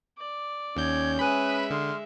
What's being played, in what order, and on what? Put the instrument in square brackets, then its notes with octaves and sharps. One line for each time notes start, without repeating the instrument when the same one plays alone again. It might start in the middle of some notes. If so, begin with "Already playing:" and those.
[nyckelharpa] D5
[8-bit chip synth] D#2 G6 [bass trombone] C#4 [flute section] G#6
[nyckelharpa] G#3 E5 [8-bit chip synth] B4 B5 [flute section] G#5 D#6 F#6
[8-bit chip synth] D3 [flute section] C6 D#6 F6